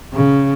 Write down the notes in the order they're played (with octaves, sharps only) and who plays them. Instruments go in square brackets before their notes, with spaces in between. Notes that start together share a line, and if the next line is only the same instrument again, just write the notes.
[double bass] C#3